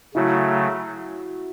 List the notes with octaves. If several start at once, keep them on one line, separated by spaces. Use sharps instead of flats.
C#3 F#3 A3 E4 F#4